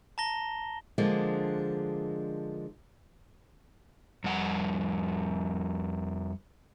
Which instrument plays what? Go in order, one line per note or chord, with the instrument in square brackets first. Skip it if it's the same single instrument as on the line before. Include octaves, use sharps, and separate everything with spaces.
[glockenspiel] A5 A#5 A#6 G7
[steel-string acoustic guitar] D3 F3 G#3 A#3 D4
[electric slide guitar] F2 G3 F#5